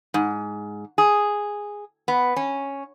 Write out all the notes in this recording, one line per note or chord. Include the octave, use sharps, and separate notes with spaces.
G#2
G#4
B3
C#4